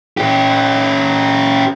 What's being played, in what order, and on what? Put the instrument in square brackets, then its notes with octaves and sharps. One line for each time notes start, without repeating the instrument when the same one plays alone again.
[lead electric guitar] C#4 G4